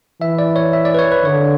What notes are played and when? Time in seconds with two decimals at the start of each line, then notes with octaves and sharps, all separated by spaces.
0.22 E3 E5
0.39 D5
0.56 C#5
0.73 E5
0.85 D5
0.94 B4
0.99 C#5
1.12 B4
1.24 D3 C#5